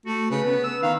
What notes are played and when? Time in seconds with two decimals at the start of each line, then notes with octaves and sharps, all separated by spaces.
0.06 A3 F#4
0.31 C#3 B4
0.44 B3
0.64 E6
0.83 D#3 F5